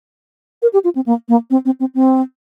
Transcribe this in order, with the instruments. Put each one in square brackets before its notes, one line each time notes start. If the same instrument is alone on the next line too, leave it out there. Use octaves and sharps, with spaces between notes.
[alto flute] A#4
G4
F4
C4
A#3
A#3
C4
C4
C4
C4